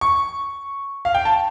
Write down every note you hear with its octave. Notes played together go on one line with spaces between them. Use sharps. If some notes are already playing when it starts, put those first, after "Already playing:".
C#6
F5
G5
A5